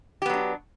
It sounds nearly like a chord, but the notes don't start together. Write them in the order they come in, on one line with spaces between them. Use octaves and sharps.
G4 B3 F#3 D4